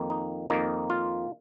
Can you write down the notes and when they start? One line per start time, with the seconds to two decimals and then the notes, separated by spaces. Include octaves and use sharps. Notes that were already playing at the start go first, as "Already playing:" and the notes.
Already playing: F2 D#3 A#3
0.10 D#4
0.50 F2 D#3 A#3 D#4
0.90 F4